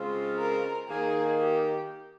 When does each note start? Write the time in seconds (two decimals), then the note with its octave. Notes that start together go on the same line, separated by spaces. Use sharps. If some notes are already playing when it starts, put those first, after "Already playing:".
Already playing: C#3 G#3 C4 F4
0.38 A#4
0.89 D#3 A#3 D#4 G#4
1.40 G4